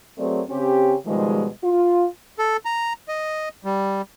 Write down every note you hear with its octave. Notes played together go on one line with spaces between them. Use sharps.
F#3 A3 C4 G#4 A#4 D5
C#3 C4 C#4 G4
B2 D#3 F3 G3 G#3
F4
A4
A#5
D#5
G3